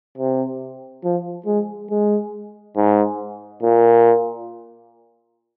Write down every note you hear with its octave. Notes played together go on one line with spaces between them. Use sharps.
C3
F3
G#3
G#3
G#2
A#2